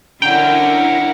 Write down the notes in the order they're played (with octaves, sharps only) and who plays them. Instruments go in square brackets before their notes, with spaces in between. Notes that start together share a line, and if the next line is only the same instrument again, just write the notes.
[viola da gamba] D3 C#4 D4 [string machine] E4 A#4 [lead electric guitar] F#5 A#5 [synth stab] G5